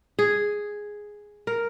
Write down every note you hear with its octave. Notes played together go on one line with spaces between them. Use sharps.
G#4
A#4